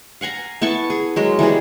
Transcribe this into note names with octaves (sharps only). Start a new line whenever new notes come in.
F5 F#5 G#5 A#5
B3 E4 A5 C#6
G#4
F#3 G#3 A#4
E3 G3 B3 G#4